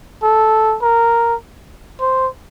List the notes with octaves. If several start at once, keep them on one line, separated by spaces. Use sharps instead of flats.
A4
A#4
C5